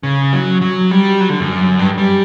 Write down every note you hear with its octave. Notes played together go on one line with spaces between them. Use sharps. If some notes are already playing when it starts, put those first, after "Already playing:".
C#3
F#3
F#3
G3
F#3
D3
F#2
G2
G3